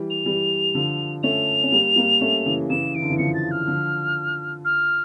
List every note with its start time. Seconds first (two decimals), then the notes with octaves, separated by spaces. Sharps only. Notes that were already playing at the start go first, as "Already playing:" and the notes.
Already playing: E3 G3
0.10 F7
0.25 E3 G3
0.75 D3 F3
1.23 A3 C#4 F7
1.64 C#4
1.72 G3 A#3
1.96 G3 A#3
2.21 A3 C#4
2.46 C#3 E3
2.70 C#3 E3 E7
2.95 E3 D7
3.02 D3
3.10 C#3 E3
3.18 D3 F3 C#7
3.34 A6
3.51 F6
3.67 D3 F3
4.65 F6